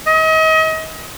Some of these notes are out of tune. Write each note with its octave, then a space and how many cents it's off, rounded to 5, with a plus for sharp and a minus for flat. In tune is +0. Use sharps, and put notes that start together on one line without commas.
D#5 +35